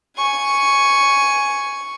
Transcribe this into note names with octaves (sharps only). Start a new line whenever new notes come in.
G#5 C#6